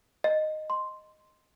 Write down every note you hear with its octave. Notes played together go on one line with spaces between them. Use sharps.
D#5
C6